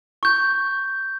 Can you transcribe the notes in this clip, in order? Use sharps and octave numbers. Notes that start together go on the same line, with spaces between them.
C#6 G6